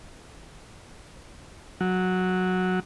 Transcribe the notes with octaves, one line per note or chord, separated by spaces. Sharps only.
F#3